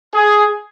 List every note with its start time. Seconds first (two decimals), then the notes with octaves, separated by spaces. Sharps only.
0.15 G#4